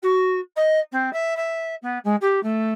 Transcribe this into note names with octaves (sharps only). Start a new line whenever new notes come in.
F#4
D#5
C4
E5
E5
B3
G#3
G4
A3